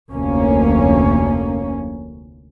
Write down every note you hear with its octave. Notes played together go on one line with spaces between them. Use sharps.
F1 D2 A#3 C#4